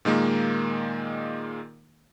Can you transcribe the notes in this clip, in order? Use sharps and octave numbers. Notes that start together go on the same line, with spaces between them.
A#2 D#3 G#3 A#3